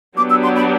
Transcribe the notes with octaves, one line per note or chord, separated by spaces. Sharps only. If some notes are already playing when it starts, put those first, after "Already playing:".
F#3 B3 D4 G4 D6
E6
C6
B5